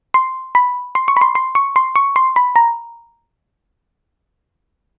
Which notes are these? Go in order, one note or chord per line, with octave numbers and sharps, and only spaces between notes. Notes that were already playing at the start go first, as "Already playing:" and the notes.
C6
B5
C6
C#6
B5
C6
C6
C#6
C6
C#6
C6
B5
A#5